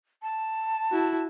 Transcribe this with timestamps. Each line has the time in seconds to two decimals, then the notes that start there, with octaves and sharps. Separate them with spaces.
0.23 A5
0.92 E4 F#4